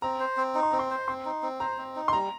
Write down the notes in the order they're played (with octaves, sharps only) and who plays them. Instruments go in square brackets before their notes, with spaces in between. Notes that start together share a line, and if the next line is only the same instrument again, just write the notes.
[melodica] C4 [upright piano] A#5
[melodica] C5
C4
D#4
[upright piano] C6
[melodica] C4 [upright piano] A#5
[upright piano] C6
[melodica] C5
[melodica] C4 [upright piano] C6
[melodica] D#4
C4
[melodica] C5 [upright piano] A#5
[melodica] C4
D#4
[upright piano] C6
[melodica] G3 [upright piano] A#5